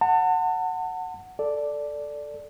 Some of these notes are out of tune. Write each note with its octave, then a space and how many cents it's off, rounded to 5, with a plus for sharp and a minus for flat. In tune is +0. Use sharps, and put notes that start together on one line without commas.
F#5 +0 A5 +35
A4 +0 D5 +0